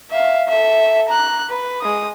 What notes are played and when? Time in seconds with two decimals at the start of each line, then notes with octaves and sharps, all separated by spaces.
0.10 E5 F5
0.48 A4 E5
1.08 A#5 F#6
1.49 B4
1.81 G#3 D#6